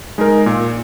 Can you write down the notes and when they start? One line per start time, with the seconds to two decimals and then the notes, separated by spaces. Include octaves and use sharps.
0.18 G#3 D#4 A#4
0.46 A#2